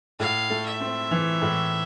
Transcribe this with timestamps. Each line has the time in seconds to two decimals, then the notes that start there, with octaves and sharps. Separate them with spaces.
0.20 A2 F5
0.50 A3
0.66 E5
0.80 C4
1.11 E3
1.42 A2